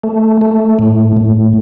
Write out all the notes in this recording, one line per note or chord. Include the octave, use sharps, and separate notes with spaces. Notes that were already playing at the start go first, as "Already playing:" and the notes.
A3
A3
A2
A2